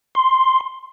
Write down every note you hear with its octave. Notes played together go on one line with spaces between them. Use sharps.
C6